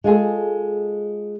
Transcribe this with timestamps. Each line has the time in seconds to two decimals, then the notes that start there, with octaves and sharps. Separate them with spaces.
0.04 G#3 F4 G#4 A4